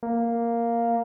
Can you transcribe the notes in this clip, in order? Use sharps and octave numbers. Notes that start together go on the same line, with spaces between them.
A#3